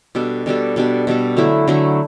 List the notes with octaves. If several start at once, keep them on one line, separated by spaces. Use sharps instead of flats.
B2 G3 D4 A4
B2 G3 D4 A4
B2 G3 D4 A4
B2 G3 D4 A4
D3 F#3 A3 E4
D3 F#3 A3 E4